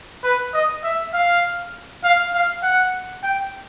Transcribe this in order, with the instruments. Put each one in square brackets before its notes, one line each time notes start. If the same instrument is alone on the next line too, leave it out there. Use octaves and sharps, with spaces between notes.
[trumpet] B4
D#5
E5
F5
F5
F5
F#5
G5